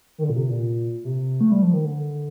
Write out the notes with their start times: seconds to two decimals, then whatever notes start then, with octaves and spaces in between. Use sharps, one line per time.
0.18 D#3
0.23 D3
0.30 A#2
0.36 C3
0.49 A#2
1.04 C3
1.41 A3
1.51 G3
1.63 F3
1.73 D#3
1.85 D3